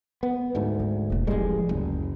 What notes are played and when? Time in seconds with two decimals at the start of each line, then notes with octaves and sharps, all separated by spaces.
0.23 B3
0.55 D2 G#2
0.80 D#3
1.10 E1 A#3
1.27 A1 D#3 F3 G3 G#3
1.69 F#1 D2